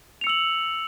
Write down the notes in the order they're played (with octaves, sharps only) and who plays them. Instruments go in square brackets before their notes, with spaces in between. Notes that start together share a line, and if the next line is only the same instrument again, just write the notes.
[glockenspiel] F7
C#7
E6
F#7